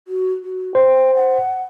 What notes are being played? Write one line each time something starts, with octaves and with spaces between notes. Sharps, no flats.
F#4
F#4
C5 G5
F#5